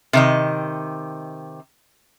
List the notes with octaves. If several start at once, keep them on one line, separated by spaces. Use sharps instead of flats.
C3 D#3 D#5